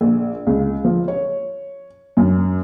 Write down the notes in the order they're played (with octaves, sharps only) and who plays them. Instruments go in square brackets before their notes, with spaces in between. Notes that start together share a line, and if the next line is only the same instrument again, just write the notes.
[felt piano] A#1
C#2
F3
C#5
F#2